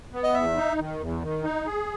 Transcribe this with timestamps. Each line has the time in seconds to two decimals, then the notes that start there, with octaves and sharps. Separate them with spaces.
0.13 B3
0.24 D#5
0.34 E2 E5
0.56 D#4
0.79 D#3
1.00 E2
1.22 D#3
1.43 D#4
1.66 G#4